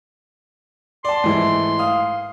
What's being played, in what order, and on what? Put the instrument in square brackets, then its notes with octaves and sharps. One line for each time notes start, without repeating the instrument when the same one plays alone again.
[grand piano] D5 A5 [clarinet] C6
[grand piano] G#2 E3 A3
F5 D#6